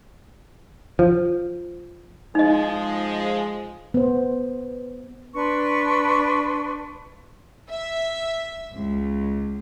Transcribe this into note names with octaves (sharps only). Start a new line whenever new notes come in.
F3
F3 G#3 D#4 D#5
B3 C5
D4 B4 C6 C#6
E5
C#2